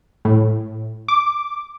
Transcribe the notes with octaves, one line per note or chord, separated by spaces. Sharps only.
A2
D6